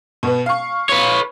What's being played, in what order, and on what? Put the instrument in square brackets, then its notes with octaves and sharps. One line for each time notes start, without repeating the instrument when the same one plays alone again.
[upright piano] B2 B3
F5 C#6
[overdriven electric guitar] B4 C#5